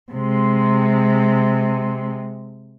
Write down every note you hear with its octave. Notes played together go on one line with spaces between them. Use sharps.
C3 G#3